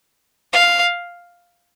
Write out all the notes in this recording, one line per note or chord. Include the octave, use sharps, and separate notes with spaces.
F5